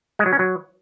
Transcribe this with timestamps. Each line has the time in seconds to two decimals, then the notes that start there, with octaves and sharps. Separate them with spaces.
0.19 G#3
0.26 F#3
0.33 C#4
0.39 F#3